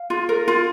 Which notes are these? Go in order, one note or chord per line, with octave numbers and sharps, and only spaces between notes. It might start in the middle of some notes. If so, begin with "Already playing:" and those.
Already playing: F5
F4
A#4
F4